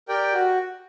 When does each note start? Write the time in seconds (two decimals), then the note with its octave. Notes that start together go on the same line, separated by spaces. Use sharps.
0.08 G4 A#4 D5 G5
0.33 F#4